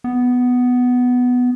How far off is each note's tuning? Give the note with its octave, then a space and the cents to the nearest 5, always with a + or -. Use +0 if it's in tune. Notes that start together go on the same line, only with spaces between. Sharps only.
B3 +5